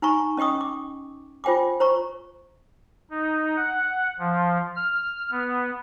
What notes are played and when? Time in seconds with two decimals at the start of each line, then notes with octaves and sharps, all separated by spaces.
0.02 D#4 G#5 A#5 C#6
0.37 C#4 D#5 G5 C#6 D#6
0.61 D6
1.44 F4 C5 G5 G#5 D6
1.80 C5 A#5 C#6
3.11 D#4
3.57 F#5
4.19 F3
4.76 F6
5.31 B3